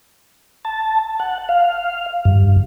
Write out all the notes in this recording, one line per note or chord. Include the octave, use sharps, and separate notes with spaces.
A5
F#5
F5
G2